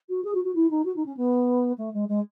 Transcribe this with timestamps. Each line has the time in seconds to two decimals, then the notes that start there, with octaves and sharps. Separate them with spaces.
0.09 F#4
0.24 G#4
0.34 F#4
0.44 F#4
0.55 E4
0.70 D#4
0.85 F#4
0.96 D#4
1.05 C#4
1.16 B3
1.77 A3
1.93 G#3
2.08 G#3